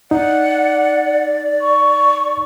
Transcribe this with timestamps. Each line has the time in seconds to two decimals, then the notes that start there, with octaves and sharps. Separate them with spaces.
0.11 D#4 D5 F#5
1.61 C#6